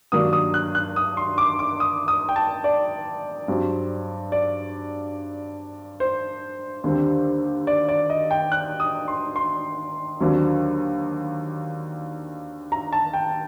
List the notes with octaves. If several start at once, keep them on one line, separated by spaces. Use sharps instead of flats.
G2 D#3 F#3 A#3 D4 D#6
D#6
F#6
F#6
D#6
C6
D6
D6
D#6
D#6
G5
A5
D5
G2 F#3 C4
D5
C5
D#2 D3 G3 C4
D5
D5
D#5
G5
F#6
D#6
C6
C6
D#2 D3 F#3 C4
A#5
A5
G5